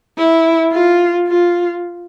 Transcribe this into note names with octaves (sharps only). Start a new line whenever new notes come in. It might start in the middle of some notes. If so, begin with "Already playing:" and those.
E4
F4
F4